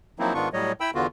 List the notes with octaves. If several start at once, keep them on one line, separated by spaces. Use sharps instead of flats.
F3 F#3 A#3 C4 D#4 E4
G#2 D#3 B3 D4 F4 C#6
A2 F#3 G3 C#5 D#5
E4 G5 B5 E6
E2 D3 B3 F4 F#4